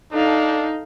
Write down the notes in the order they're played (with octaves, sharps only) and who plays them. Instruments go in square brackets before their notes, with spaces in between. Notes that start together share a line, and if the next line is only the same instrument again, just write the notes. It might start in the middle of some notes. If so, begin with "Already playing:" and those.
[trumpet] D4 [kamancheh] D#4 [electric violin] A4 F5